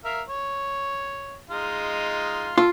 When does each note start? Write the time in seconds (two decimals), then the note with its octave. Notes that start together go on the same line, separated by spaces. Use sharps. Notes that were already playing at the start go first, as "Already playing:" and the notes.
0.05 A#4 E5 F5
0.29 C#5
1.50 G#3 D#4 F4
2.58 F4 A4